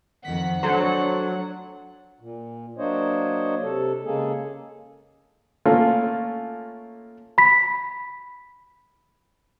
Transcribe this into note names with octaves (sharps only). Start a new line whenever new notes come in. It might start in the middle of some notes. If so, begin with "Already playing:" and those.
F2 D#3 F3 F#5 B6
F#3 A3 D4 A4 C5
A#2
F#3 A#3 D4 C5 C#5 D#5
C3 A4
C#3 G#3 A#3 G#4 A4
A3 A#3 C#4 F4
B5 B6